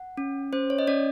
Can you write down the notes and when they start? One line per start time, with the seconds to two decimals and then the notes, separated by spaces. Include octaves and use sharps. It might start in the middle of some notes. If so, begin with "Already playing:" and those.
Already playing: F#5
0.17 C#4
0.53 C#4 C5
0.70 C#5
0.79 D#5
0.87 C#4 D5